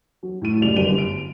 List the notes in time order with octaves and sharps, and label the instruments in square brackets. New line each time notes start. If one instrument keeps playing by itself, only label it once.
[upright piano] F#3
A2 D#7
C2 F#2 G#3 D5 F7
G1 F#2 D#7 F7 G7
D7